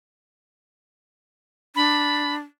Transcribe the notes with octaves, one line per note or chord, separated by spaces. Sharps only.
D4 B5